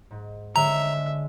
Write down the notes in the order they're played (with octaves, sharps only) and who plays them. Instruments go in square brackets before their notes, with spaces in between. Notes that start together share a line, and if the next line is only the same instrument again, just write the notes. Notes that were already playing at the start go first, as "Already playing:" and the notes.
[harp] G#2
[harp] D3 G#3 C#5 [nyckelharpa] E5 [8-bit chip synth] A#5